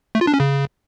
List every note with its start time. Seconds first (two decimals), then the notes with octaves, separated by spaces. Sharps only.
0.15 A3
0.21 F4
0.27 D4
0.34 C#4
0.40 C#3